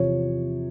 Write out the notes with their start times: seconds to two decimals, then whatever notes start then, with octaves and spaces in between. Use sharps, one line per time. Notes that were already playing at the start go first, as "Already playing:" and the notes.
Already playing: E2 C3 F3 C#5